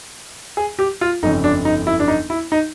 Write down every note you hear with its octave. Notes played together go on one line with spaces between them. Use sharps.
G#4
G4
F4
G1 F2 C#3 D#4
D4
D#4
E4
D4
D#4
E4
D#4